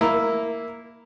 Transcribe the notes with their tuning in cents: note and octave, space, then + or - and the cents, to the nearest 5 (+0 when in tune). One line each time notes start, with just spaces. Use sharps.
A#3 +0 E4 +0 A#5 +0